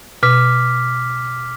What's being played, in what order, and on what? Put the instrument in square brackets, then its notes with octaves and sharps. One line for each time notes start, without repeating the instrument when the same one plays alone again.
[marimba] B2 [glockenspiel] D6 F6 B6